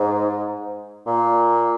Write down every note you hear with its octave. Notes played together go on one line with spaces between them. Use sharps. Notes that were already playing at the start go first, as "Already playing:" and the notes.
Already playing: G#2
A#2